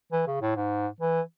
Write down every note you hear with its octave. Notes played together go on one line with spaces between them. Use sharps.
E3
C#3
A2
G#2
E3